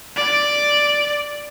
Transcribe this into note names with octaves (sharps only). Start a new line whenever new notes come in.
D5